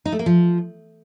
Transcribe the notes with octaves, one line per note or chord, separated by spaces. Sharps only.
D#4
A3
A#3
F3